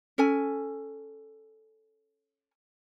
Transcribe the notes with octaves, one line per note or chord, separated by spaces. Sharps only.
C#4 A4 G#5